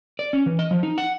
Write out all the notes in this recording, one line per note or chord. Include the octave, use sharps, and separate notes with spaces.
D5
C#4
E3
D#5
F3
D#4
F#5